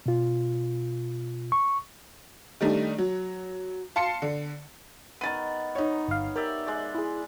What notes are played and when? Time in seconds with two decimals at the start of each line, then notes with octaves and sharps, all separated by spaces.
0.06 B2 F4
1.52 C#6
2.61 D#3 G3 A3 D4 D#4
2.98 F#3
3.96 F5 A5 C6 C7 C#7
4.22 D3
5.21 D#3 B3 A6 D#7
5.75 D#4 C#5
6.08 G1 F5
6.36 G4 A#4 D5 E5
6.67 G#3 D5
6.95 E4 G#4